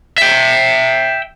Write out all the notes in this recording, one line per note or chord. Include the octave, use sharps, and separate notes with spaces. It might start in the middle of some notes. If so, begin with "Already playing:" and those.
E5 G5